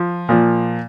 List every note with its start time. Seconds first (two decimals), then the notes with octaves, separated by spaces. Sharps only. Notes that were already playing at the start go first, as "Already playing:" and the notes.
Already playing: F3
0.29 A#2 F3